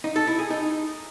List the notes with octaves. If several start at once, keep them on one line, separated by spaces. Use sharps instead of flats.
D#4
A4
E4
G#4
D#4